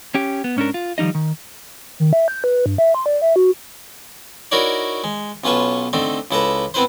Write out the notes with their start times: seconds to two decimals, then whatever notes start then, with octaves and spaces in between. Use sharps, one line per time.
0.14 C#4 G4
0.44 B3
0.56 G#2 C#4 D4 A#4
0.74 F4
0.98 D#3 F3 G3 D#4 D#5
1.15 D#3
2.00 D#3
2.13 E5
2.28 G6
2.44 B4
2.66 G2
2.78 E5
2.95 C6
3.06 D5
3.22 E5
3.36 F#4
4.52 D#4 E4 F#4 A#4 C#5 D5
5.04 G#3
5.44 B1 C#4 F4 B4 A5 C#6
5.93 D3 A3 C4 D#4
6.31 C#2 E4 A4 B4 A#5
6.74 B3 C4 E4 B4 C5